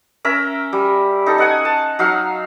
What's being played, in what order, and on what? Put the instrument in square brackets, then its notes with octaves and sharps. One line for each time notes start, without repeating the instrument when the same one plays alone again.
[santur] C#4 A#4 E5
G3
D#4 A4
D#5 F#5 G#5
A5
F#3 D#4 F5